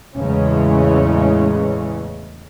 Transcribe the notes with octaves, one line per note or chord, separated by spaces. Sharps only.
E2 A2 C#3 E3 G#3 C#4